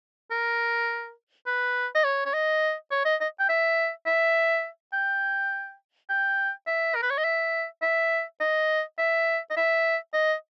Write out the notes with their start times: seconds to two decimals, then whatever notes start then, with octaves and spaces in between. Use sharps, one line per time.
0.31 A#4
1.47 B4
1.95 D#5
2.04 C#5
2.25 C#5
2.33 D#5
2.91 C#5
3.05 D#5
3.21 D#5
3.39 G5
3.49 E5
4.06 E5
4.93 G5
6.10 G5
6.67 E5
6.95 A#4
7.03 B4
7.10 C#5
7.18 D#5
7.24 E5
7.82 E5
8.41 D#5
8.98 E5
9.50 D#5
9.56 E5
10.14 D#5